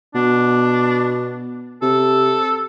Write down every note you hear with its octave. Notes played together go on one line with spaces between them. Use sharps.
B2 D4
C3 A4